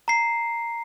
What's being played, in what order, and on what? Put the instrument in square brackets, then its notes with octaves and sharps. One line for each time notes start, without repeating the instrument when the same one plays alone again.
[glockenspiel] A#5 C7